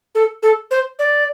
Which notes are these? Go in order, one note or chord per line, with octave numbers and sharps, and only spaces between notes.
A4
A4
C5
D5